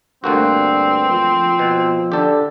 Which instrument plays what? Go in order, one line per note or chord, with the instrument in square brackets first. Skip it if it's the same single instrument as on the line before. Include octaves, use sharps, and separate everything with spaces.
[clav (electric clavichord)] D2 A#3 F#4 [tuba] G2 [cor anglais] C4
[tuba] F3
[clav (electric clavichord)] B2
[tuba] D3 [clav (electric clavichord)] G4 A4